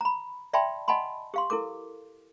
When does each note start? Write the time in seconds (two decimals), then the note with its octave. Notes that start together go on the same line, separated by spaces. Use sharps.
0.01 A#5 B5
0.53 D5 E5 G5 A5 B5 C6
0.88 D#5 F#5 G#5 A5 B5 C6
1.34 G4 F5 C6
1.50 E4 A4 A#4 D6